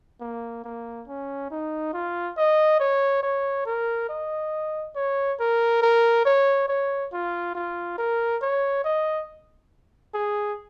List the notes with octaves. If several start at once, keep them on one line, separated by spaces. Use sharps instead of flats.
A#3
A#3
C#4
D#4
F4
D#5
C#5
C#5
A#4
D#5
C#5
A#4
A#4
C#5
C#5
F4
F4
A#4
C#5
D#5
G#4